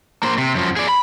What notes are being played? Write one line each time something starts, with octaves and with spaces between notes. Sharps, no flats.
A#3 C5
C3
F#2 F3
G#4 D5
B5